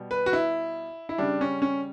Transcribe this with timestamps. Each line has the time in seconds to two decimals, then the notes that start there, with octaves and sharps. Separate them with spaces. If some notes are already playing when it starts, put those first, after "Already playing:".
Already playing: B2 G3
0.11 B4
0.26 F#4
0.33 E4
1.09 E4
1.18 C#3 G3 D4
1.41 C#4
1.62 C#4